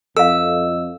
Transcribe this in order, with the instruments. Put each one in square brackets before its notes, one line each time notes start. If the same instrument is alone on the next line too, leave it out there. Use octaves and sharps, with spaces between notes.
[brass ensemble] F2 [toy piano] A4 F5 [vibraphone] D#5 [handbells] E6